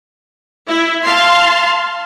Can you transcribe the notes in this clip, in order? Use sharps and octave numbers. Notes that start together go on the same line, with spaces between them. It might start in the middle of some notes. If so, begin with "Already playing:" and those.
E4
F5 A5 C6